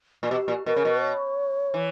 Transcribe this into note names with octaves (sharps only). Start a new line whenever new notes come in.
A#2
B2 G4
A#2
B2 A#4
C#3
B2
C#5
E3